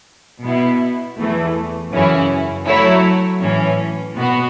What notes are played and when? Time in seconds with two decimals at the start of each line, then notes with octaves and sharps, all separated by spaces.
0.44 B2 B3 E4
1.18 E2 E3 A3
1.92 F#2 C#3 E3 C#4 E4
2.67 F#3 A3 E4 C#5
3.42 A2 E3 C#4
4.16 B2 B3 F#4